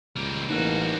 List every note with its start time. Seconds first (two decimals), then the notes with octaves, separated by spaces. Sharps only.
0.16 C#2 G3 A#3
0.50 A1 G3 A#3 D#4 F#4